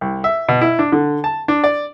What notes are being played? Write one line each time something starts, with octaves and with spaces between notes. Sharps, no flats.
C2
E5
B2
E4
D4
D3
A5
D4
D5